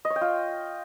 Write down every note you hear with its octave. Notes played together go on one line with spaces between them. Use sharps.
D#5
C#5
G5
F4